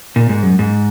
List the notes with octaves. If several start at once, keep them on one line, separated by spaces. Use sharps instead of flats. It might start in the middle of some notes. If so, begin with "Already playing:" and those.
A#2
G#2
F#2
G#2